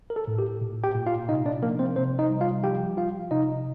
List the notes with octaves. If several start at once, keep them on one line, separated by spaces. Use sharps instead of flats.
A#4
A4
A2
G4
A#2
G4 G5
A#2
F4 F5
C3 D#4 D#5
D4 D5
F3 A#3 A#4
C4 C5
C3 C4 C5
D#4 D#5
G3
F4 F5
F3 G4 G5
F3 F4 F5
C3 D#4 D#5